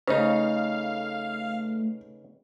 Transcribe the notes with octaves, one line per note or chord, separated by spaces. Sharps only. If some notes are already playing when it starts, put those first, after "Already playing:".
C#3 A3 D#4 B4 F5